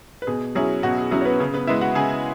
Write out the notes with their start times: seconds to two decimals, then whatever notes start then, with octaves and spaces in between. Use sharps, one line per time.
0.22 B4
0.27 B2 G#4
0.55 F#3 C#4 E4 G#4
0.83 B2 F#4
0.98 G#4
1.11 F#3 C#4 E4 G#4
1.21 C#5
1.25 B3 B4
1.40 C#3 G#4
1.54 B3 B4
1.67 G#3 B3 E4 E5
1.81 F#4 F#5
1.95 C#3 G#4 G#5